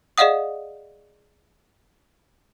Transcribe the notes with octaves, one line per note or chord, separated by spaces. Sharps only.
G#4 D5 D#5 F5 F#5 D#6